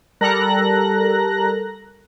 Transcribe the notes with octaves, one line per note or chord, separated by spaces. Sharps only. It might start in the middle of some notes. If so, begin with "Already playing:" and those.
G3 A4 A#4 A#5 F#6 A#6